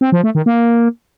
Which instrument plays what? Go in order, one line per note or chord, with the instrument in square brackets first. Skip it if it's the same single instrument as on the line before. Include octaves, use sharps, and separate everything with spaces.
[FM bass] C4
F3
A3
D#3
A#3